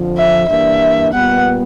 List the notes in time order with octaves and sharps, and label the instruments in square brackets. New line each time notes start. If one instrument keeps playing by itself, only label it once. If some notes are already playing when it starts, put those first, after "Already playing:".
Already playing: [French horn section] F2 D3 F3
[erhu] E5
[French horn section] G2 E3 G3 A#3 D4 [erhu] E5
[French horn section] A#2 G3 B3 [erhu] F#5